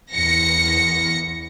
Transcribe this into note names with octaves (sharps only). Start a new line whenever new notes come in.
E2 A#6 C#7